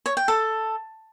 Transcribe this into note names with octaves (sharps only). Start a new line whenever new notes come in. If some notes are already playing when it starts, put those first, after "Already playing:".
C#5
G5
A4